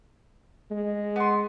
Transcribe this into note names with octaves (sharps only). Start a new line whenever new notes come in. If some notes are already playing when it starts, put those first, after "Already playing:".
G#3
B3 C6